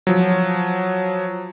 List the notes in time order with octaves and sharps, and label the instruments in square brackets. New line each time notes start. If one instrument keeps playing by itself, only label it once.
[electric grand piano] F3 F#3